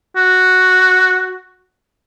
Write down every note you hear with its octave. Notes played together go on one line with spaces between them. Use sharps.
F#4